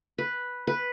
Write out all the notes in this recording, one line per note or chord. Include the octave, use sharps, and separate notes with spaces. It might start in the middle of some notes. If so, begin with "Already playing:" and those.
B4
B4